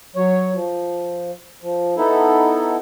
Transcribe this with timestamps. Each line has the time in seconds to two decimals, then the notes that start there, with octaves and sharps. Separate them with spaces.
0.16 F#3 C#5
0.54 F3
1.62 F3
1.97 B3 D#4 E4 A4